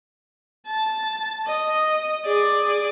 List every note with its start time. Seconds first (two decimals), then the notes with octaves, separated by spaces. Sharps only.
0.67 A5
1.47 D#5
2.26 G#4 D5